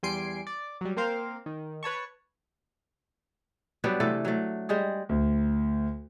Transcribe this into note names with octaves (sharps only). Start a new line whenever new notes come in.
E2 G3 G#5 C6 C7 D7
D5
F#3 G3
A#3 C4 A#4 C5 F5
D#3
B4 C#5 A5 C#6
F#3 G3 B3 D4
C3 E3 A3 A4
F#3 A3
G3 G#3 G#4
D2